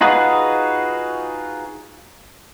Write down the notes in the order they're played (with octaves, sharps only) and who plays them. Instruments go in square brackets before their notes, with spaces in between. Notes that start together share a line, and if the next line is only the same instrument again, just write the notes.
[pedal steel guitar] D#4 F4 F#4 G#4 B4